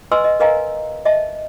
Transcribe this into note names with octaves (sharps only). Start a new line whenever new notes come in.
B4 D#5 G#5 C6 E6
D#5
A#4 B4 D#5 F5 G#5 A#5
D#5 E5 A5